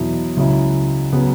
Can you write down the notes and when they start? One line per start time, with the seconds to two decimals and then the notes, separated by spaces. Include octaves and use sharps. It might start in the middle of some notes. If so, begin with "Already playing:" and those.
Already playing: E2 B2 F#3 E4
0.37 C#2 C#3 F#3 E4
1.13 C#3 F#3 B3